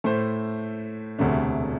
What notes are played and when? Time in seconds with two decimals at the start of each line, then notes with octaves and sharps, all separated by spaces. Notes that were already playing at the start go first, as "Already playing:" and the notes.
0.04 A2 A3 E4 C5
1.18 E1 D2 C3 A3 D4